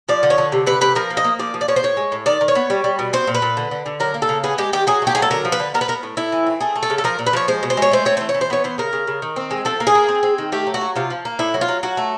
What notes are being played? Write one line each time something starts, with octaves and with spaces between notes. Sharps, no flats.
F3 D5
D3
C#5
D3
C3
C3 B4
C3 B4
F3 A#4
A#3
D#5
A#3
F3 D5
F3
D5
F3 C#5
C5
A2 C#5
G#3
A2
D#3 D5
D#3
C#5
B3
G3
G3
B2
C4 C5
A#2
B4
A#2
D3
D3
D3
F#3 A#4
A#3
A4
C#3
B3 G#4
G#3 G4
D#3 G4
F#3 G#4
A3 G4
F#3 G#4
A4
D3 A#4
F3
B4
D3
B3 A#4
B4
B3 A#4
A2
A2 E4
E3
C4
A3 G#4
A3
A4
C#3
A4
F3 A#4
A#2
B4
F3 C#5
G#3 C5
B2
C5
G#3 C#5
A3 C5
C4 C#5
E3 C5
C#5
E3
C5
B3 C#5
E3 C5
C#3 A#4
C#3
C#3
D#3
C4
G#3
F3 A4
A#3
G#4
A#3
C4
C4
D#3
A3 G4
F#3
F#4
F#3
C3 F4
F3
A#3
A2 E4
F#3
F4
F#3
F#3 F#4
A3